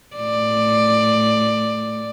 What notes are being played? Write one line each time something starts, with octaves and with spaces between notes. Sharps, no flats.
A2 D5